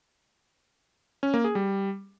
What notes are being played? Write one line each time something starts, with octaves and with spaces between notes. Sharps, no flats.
C#4
A#3
G#4
G3